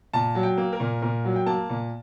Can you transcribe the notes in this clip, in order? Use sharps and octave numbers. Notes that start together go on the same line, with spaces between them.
A#2 A5
F#3
G5
A#3
A#4
A#2
A#2 A#4
F#3
G5
A#3 A5
A#2